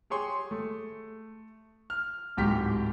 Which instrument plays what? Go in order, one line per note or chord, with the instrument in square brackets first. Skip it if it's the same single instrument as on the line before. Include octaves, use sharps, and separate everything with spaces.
[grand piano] G4 G#4 C#5 C6
A3
F6
D1 G#2 G4 B6